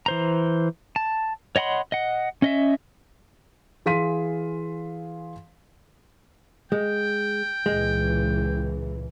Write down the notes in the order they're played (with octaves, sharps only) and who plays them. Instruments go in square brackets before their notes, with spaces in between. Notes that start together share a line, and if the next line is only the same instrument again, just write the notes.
[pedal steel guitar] E3 C5 A#5
A5
C#5 D#5 F#5 B5 C6
D#5 F#5
C#4 D#5 E5
[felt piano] E3 G#4 F5 C6 B6 D#7
[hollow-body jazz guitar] G#3 [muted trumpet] G5
[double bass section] C#2 A#2 E3 [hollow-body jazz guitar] G#3